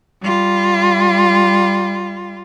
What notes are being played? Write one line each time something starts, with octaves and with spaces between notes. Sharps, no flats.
G3 F4